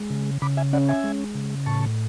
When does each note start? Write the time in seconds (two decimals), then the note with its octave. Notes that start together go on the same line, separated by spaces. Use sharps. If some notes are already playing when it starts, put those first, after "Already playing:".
Already playing: G#3
0.10 C#3
0.42 C#3 B5 D6
0.57 E5 G#5
0.73 C#4 D5 F#5
0.89 E5 G#5
1.04 G#3
1.35 C#3
1.66 A2 A5 C#6